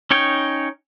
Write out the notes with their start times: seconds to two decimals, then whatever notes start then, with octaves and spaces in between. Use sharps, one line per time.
0.11 C#4 D#4 C#5 G5